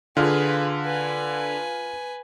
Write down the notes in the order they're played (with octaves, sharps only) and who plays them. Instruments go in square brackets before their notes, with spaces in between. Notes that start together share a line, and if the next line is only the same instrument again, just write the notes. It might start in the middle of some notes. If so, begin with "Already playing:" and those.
[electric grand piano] D3 [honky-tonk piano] F4 F6 [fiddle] G#4 B4
[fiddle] B4 G#5